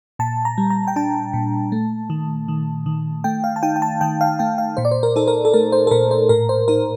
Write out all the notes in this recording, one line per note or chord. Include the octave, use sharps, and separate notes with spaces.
A#2 A5
A#5
G3
A#5
G5
D4 A5
A#2
A3
D#3
D#3
D#3
A3 G5
F5
A5
D#4 G5
G5
A5
D#3 G5
F5
A3 G5
F5
A#2 C5
D5
C5
A#4
D#4 A4
A#4
A4
A3 A#4
C5
A4
A#2 A#4
C5
A2 A#4
C5
D#4 A#4